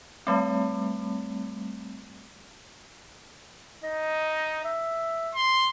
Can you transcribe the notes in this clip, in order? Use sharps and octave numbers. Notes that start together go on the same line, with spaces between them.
G3 A3 C4
D#4 D#5
E5
C6